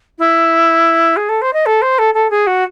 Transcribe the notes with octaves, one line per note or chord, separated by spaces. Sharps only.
E4
G#4
A4
C5
D#5
A4
C5
A4
A4
G#4
F#4